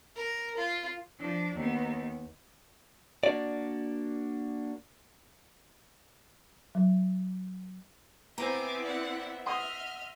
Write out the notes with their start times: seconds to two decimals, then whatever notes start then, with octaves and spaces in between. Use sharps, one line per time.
0.16 A#4
0.57 F4
1.19 F3 D4
1.56 D#2 B3
3.23 A#3 D4 F#4 D5
6.75 F#3
8.38 B3 C4 E4 C5 E5 G#5 A#5 D6
8.84 D5 F#5
9.46 D#5 E5 F#5 C6 D#6 F6